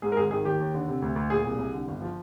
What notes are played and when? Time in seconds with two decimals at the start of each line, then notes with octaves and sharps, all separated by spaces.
0.02 G#2 G#4
0.12 A#4
0.17 G#1 G#4
0.31 D#3 G#4
0.45 D#2 G4
0.60 D#2
0.74 D3
0.88 C3
1.02 D2
1.16 D2
1.30 A#2 G#4
1.45 C2
1.58 C2
1.73 D3
1.88 G1
2.02 F3